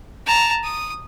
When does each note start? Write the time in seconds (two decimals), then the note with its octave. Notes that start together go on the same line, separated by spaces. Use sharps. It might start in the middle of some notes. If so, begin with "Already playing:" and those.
0.26 A5 A#5
0.64 D#6